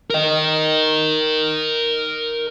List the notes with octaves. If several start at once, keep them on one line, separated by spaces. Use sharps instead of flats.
A#4 D#5